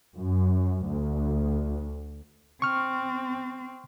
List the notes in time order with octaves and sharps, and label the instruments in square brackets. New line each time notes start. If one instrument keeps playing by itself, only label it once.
[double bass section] F#2
D2
[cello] C4 [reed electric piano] C#6 F6